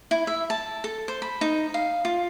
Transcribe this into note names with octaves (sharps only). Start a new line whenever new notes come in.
E4
E5
A5
A4
C5
B5
D#4
F5
F4